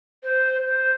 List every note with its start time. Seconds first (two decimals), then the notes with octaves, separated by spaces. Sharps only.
0.23 C5
0.67 C5